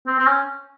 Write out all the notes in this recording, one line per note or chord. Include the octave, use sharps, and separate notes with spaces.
C4
C4
C#4